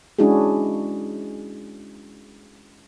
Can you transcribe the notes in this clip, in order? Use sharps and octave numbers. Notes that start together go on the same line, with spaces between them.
G#3 C#4 D4 E4 F#4 G#4